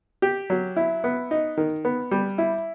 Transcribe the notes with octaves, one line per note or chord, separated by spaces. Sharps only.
G4
F#3
E4
B3
D#4
D#3
B3
G3
E4